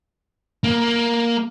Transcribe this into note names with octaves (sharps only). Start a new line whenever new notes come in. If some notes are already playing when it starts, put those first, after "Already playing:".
A#3